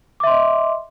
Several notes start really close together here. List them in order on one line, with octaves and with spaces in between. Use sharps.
D6 E5 C6 D#5